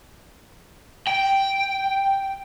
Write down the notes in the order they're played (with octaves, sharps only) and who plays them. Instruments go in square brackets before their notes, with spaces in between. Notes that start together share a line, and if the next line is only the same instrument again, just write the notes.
[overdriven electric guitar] G5